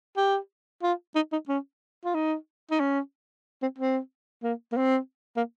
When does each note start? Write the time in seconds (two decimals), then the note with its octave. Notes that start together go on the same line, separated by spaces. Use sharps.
0.17 G4
0.83 F4
1.15 D#4
1.32 D#4
1.48 C#4
2.05 F4
2.14 D#4
2.71 D#4
2.80 C#4
3.62 C4
3.78 C4
4.43 A#3
4.72 A#3
4.77 C4
5.36 A#3